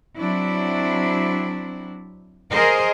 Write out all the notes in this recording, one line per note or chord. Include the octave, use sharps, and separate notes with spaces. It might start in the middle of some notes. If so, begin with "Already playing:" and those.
F#3 C4 D4 E4
G#4 A#4 C5 D#5